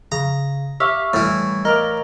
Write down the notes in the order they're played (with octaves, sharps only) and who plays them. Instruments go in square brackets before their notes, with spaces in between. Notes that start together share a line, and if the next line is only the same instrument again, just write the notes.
[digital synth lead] C#3 [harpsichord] A#5
[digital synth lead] G4 [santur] E5 F5 C#6
[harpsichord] A2 E3 [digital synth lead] G3 [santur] E6
[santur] A#4 D5 F5 [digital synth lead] D#5